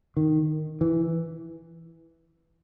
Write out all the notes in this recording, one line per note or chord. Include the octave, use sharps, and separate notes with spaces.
D#3
E3